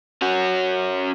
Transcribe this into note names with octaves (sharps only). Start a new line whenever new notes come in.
C#4 F#4